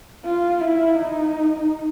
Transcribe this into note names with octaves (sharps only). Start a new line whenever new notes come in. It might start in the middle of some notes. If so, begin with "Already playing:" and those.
F4
E4
D#4